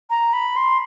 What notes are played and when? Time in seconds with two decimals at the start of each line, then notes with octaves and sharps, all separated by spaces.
0.10 A#5
0.33 B5
0.57 C6